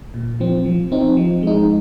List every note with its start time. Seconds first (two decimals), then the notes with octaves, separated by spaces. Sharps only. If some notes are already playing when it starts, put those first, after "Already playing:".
0.14 A#2
0.40 F3 C4
0.66 F3
0.92 C4 D#4
1.17 F3
1.43 G#3 D#4